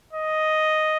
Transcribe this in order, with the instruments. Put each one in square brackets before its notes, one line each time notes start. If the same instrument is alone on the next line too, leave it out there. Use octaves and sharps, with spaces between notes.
[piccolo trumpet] D#5